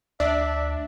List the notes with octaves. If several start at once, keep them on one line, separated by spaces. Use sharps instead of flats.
D2 D4 E5